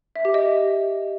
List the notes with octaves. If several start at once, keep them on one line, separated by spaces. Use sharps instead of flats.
E5
G4
D#5